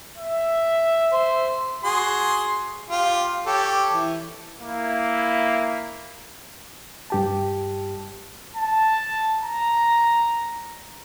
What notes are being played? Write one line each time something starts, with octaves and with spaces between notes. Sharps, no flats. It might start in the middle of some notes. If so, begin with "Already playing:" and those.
E5
C5
F#4 G#4 C6
F4 G4
G4 A4 C#5
E3
A#3 E4
G2 G4 A5
A5
A#5